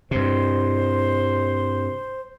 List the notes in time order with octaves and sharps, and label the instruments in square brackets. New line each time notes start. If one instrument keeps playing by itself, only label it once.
[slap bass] G2 C3 [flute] C5